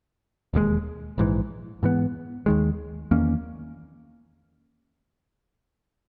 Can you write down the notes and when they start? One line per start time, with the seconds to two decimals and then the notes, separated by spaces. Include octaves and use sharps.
0.54 E1 D#2 C#3 G#3
1.18 A#1 G#2 E3
1.83 G#2 E3 B3
2.46 D#2 D#3 G#3
3.11 E2 D#3 A#3 C#4